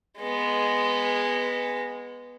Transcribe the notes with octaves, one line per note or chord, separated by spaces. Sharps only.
G#3 B3